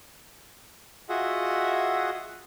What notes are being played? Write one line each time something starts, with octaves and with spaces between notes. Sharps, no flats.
F4 F#4 G#4 D#5 E5 F#5